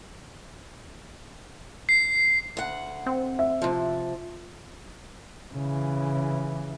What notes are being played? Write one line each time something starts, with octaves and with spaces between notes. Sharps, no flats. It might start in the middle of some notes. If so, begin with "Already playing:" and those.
C7
D2 F#5
C4
E5
C3 F3
C#3 E3